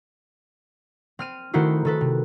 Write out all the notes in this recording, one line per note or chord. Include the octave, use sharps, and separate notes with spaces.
C4 F6 D#7
D#3 A3 C4 E4 F#4 C5
D#3 A4 B4
C3